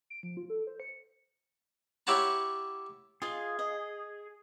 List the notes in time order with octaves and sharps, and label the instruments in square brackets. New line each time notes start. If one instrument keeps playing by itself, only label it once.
[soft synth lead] D7
F3
F4
A4
C5
C#7
[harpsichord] E4 G4 C#5 F#5 A5 A#5
[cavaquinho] F4 D#5 F5 [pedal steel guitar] G#4
[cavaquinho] D#5